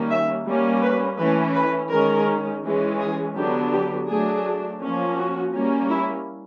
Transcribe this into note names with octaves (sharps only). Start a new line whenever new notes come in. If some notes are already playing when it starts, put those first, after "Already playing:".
Already playing: D#3 G3 A#3 C#4
E5
G3 A#3 C#4
B4
E3 A3 C#4 B4
B4
D#3 G#3 C#4 A#4
E3 G#3 C#4
G#4
D3 F#3 B3 D4 G4
G4
F#3 A3 D4 G#4
F3 A#3 C#4
F#4
G3 A#3 C#4
E4